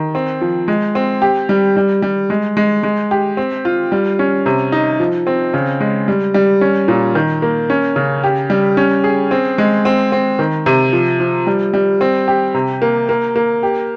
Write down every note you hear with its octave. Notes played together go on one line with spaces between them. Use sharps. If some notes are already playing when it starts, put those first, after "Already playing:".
Already playing: D#3
C4
F3
G#3
C4
G4
G3
G3
G3
G#3
G#3
G#3
G4
C4
F4
G3
C#4
C3
D#4
F3
C4
C#3
G#3
G3
G3
C#4
A#2
D#3
A#3
C#4
C#3
G4
G3
C#4
G#4
C4
G#3
C4
C4
D#3
C3
F3
F3
G3
G3
C4
G4
C3
A#3
A#3
A#3
G4